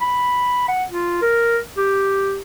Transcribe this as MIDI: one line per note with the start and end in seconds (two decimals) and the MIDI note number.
0.01 0.63 83
0.68 0.85 78
0.90 1.17 65
1.22 1.59 70
1.77 2.39 67